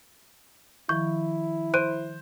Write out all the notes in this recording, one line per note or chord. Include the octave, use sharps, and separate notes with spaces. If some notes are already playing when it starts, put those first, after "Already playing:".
D#3 F3 E4 C#6 G6
C5 F#6 D7 D#7